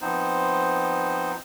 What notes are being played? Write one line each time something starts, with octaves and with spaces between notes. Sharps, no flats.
F3 B3 C4 D#4 C5